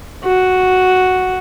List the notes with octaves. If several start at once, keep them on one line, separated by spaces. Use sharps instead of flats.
F#4